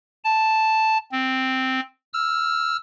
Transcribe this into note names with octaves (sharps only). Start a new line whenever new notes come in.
A5
C4
E6 F6